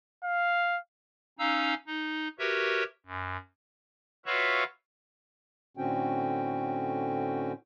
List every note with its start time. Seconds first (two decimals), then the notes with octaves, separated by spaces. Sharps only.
0.24 F5
1.39 C#4 D#4 F5 A#5 E6
1.87 D#4
2.39 F#4 G4 A#4 B4 C#5 E5
3.06 F#2
4.26 F4 F#4 B4 C#5 E5 F5
5.77 A2 D3 C4 C#4 F#4 G5